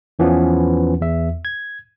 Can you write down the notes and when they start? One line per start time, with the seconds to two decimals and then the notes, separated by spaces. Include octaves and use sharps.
0.19 E2 E3 F3 B3 C#4
1.01 E2 E5
1.45 G#6